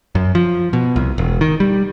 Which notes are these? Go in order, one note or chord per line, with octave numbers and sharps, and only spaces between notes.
F#2
F3
B2
C2
E1
D#3
G3